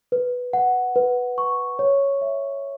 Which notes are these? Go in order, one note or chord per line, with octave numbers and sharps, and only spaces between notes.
B4
F#5
B4
C#6
C#5
E5